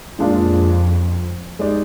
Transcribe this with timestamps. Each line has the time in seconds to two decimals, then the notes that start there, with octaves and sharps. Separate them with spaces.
0.19 F2 A#2 G#3 D4 F4
1.59 G#3 D#4 G4 D5